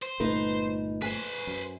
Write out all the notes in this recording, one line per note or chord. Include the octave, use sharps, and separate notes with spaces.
C5
G1 A#2 A3 D#4 B4
B4 C5 G#5
F#2